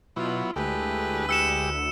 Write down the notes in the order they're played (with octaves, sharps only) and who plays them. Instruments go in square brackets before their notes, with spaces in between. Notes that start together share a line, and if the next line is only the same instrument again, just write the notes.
[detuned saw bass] B2 [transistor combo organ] F#3 B3 E4 [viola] F4
[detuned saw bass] D2 [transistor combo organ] G#3 A3 G4 [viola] E4 B4
[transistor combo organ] G#3 G4 [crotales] E6 C#7 E7